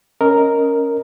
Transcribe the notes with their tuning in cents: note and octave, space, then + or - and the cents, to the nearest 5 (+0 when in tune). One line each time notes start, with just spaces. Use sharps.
C#4 +0 A#4 +0 D#5 +5